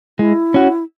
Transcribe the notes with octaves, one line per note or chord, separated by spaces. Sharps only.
G#3 E4
C#4 F#4